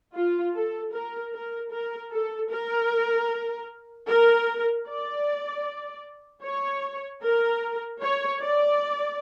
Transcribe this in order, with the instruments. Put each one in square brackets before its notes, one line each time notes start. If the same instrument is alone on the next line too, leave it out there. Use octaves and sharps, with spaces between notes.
[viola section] F4
A4
A#4
A#4
A#4
A4
A#4
A#4
D5
C#5
A#4
C#5
D5